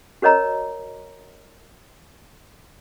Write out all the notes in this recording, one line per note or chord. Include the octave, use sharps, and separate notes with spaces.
F#4 A#4 C#5 D#5 A#5